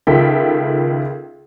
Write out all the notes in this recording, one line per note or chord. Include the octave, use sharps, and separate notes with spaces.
C#2 D#3 F4 A4 E5 G5